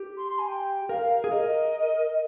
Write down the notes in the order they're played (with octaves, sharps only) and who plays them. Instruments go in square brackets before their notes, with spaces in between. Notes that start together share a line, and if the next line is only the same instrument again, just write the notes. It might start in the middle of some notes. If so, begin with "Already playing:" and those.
Already playing: [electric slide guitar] G4
[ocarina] C6
C6
G#5
G5
[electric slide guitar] A#4 [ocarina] F5
[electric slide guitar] G#4
[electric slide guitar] A#4 [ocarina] D#5